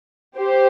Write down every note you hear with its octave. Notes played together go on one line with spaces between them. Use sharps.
G4 C5